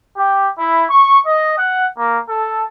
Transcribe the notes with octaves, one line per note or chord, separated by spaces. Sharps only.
G4
E4
C#6
D#5
F#5
A#3
A4